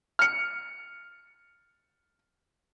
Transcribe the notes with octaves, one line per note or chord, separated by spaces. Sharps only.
F6 C#7